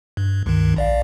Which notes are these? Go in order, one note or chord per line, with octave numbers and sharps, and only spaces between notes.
G2
C#2 G2 D#3
A#1 D5 F5